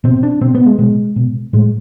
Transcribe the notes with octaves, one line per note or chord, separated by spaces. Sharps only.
B2 C4
D4
B2 C4
B3
G#3
B2 G#3
B2
A2 G#3